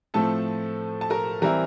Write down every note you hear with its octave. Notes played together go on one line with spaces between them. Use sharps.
A2 F3 A3 C4 A4 A5
A5
A#4 A#5
E3 G3 C4 E4 A#4 A#5